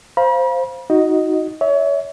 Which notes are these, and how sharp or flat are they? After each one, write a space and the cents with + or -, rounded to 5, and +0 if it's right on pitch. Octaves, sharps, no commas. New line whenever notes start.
C5 +0 F5 +0 B5 -45
D#4 +25 F#4 +0 D#5 +0
C#5 +30 E5 -30